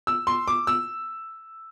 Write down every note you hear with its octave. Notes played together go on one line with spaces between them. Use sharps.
E6
C6
D6
E6